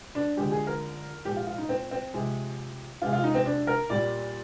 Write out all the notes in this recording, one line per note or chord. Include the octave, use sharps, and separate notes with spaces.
D4
D3 F3 G#3 G4
G#4
A#4
A#2 F3 G#3 G4
F4
F4
D#4
C4
C4
C3 F3 G#3
C3 F3 G#3 F4
F4
D#4
C4
D4
A#4
A#2 G3 D5